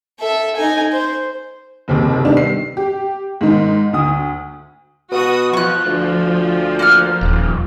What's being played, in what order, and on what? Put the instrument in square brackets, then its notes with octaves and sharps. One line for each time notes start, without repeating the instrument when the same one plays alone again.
[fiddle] A4 E5
D#4 G#5
C5
[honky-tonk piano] F#1 D#2 C3
D#3 G3 B3 D4
C7
G4
G#2 D#3
D2 D#6
[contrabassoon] B2 [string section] F#4 D#6
[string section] F3 [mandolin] C#6 F#6
[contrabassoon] D2
[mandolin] A#3 F#5 F6
[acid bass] D#1